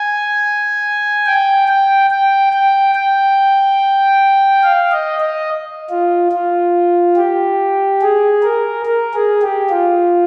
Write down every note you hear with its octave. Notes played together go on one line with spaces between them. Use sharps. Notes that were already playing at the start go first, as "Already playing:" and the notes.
Already playing: G#5
G5
G5
G5
G5
G5
F5
D#5
D#5
F4
F4
G4
G#4
A#4
A#4
G#4
G4
F4